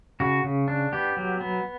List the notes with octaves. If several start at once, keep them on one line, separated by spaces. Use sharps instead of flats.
C#3 F#4
C#3
D4
B3 G4
F#3
B3